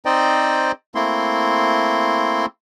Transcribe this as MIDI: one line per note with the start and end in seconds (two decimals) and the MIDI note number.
0.05 0.72 60
0.05 0.72 63
0.05 0.72 72
0.05 0.72 74
0.05 0.72 75
0.05 0.72 79
0.95 2.46 57
0.95 2.46 58
0.95 2.46 60
0.95 2.46 64
0.95 2.46 84